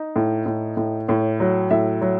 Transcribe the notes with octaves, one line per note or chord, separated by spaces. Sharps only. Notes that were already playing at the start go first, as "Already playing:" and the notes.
Already playing: D#4
A2
A2
A2
A2 C#5
F#3
A2 E5
F#3